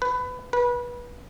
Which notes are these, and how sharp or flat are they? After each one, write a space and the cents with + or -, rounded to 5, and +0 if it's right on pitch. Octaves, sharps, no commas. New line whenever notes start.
B4 +20
B4 -25